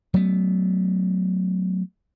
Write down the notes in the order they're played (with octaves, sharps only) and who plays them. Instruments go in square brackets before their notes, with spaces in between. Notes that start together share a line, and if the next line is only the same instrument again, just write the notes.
[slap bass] F#3 A3 B3